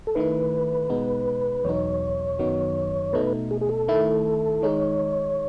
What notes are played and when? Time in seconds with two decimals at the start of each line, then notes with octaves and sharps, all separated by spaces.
0.07 A4
0.15 D#3 A3 E4 B4
0.90 B2 G#3 B3 D#4
1.64 E2 B2 F#3 B3 D#4 C#5
2.39 F#2 D#3 F#3 B3 D#4
3.13 B2 A3 D#4 B4
3.51 G#4
3.61 G#4
3.69 A4
3.88 D#3 A3 E4
4.62 D#3 G#3 D#4 C#5